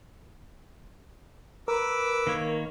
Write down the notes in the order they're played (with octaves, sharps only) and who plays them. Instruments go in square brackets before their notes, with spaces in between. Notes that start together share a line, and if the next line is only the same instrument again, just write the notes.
[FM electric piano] A#4 [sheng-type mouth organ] B4 D6 E6
[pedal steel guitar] D#3 A#3 C#5